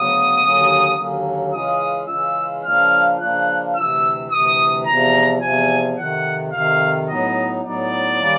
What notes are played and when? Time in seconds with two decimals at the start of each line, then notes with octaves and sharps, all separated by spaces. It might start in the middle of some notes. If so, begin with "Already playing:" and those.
Already playing: D2 C#3 F#3 B3 D#6
0.43 D#2 D3 F#3 A#3 C#4
0.98 D#2 D3 F#3 A#3 C#4
1.53 C#3 E3 G#3 C#4 F4 D#6
2.08 C#3 E3 G#3 C#4 F4 E6
2.65 C#3 F3 A#3 D4 F4 F6
3.20 C#3 F3 A#3 D4 F4 F#6
3.75 D2 C3 E3 E6
4.31 D2 C3 E3 D#6
4.86 E2 C3 F3 A#5
5.42 E2 C3 F3 G#5
5.97 F2 C3 D#3 F#5
6.52 F2 C3 D#3 F5
7.08 A2 F#3 B3 D#4 D#5
7.63 A2 F#3 B3 D#4 D5
8.19 D#3 G3 A#3 C#4